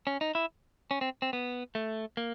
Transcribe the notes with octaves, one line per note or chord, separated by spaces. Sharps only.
C#4
D#4
E4
C#4
C4
C4
B3
A3
A#3